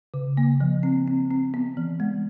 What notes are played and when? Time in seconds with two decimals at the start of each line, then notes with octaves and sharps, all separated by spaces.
0.14 C#3
0.37 A#3
0.60 F3
0.83 C4
1.07 C4
1.31 C4
1.54 B3
1.77 E3
2.00 G#3